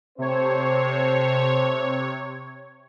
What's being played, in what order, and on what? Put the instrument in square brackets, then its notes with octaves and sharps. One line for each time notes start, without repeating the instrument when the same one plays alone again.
[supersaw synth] C3 C#5 [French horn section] A3 C4 C5